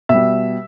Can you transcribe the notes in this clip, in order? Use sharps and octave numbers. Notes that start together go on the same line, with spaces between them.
B2 G3 E5